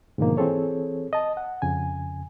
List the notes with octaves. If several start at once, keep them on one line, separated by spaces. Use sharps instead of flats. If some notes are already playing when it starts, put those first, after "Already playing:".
G#2 B2 D3 D#3 F3 A#3
E3 C4 G#4 A4 C#5
D#5 A5
F#5
F2 C#3 G#5